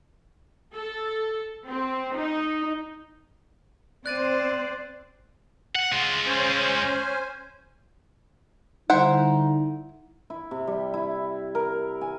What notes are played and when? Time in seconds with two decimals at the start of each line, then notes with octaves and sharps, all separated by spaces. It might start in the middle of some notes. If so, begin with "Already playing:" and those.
0.72 A4
1.67 C4
2.16 D#4
4.06 C4 C5 D5 F#6 A6 D#7
5.75 F#5
5.92 G#3 F4
6.26 C#4 C5 G#5
8.90 D3 G3 D#4 E4 C5 F#5
10.30 E4
10.51 C3
10.67 G3
10.94 E4
11.55 A#4
12.01 G#5